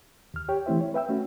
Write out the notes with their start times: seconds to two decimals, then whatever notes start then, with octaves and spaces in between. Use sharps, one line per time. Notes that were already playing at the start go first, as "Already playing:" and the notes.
0.34 D#2 F6
0.49 G4 C#5 G5
0.66 E3 A3 C4 E4 C5 E5
0.81 C#5
0.94 B4 E5 G5 E6
1.09 A3 C#4 F#4